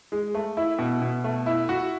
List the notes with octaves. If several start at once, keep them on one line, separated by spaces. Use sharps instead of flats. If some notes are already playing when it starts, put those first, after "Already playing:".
G#3
A3
E4
B2
B2
A3
E4
F#4